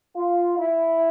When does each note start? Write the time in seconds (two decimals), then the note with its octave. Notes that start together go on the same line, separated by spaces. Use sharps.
0.15 F4
0.57 E4